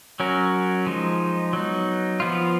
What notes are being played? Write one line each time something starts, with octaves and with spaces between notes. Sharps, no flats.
F#3 C#4 F#4 A#4
F3 G#3 D#4
F#3 B3 D#4
F3 B3 F4